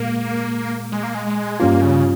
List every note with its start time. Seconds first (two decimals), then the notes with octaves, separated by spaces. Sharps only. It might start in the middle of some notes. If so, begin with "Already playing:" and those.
Already playing: A#2 G#3 A#3
0.92 G#3
1.03 A#3
1.15 G#3
1.26 G#3
1.60 G2 G3 A#3 C#4 F4
1.82 C#3